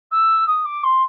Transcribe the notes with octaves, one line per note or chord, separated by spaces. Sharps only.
E6
D#6
D6
C6